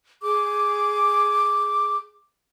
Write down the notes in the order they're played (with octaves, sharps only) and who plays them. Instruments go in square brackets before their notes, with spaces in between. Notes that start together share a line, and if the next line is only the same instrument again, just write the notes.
[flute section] G#4 D6